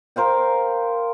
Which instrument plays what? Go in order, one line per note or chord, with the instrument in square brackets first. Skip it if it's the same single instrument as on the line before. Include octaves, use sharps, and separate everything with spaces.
[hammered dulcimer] A#4 C5 F5 G5